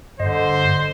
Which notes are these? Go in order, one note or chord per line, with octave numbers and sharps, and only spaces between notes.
G2 D3 C5 D#5